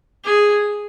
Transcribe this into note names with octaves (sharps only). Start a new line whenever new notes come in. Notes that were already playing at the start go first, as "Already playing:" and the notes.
G#4